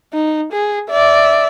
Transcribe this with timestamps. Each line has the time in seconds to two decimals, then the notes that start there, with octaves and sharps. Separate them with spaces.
0.14 D#4
0.53 G#4
0.90 D5 E5